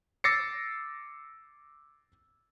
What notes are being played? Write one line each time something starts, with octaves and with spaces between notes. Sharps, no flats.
D6 E6 A6 A#6 C7 C#7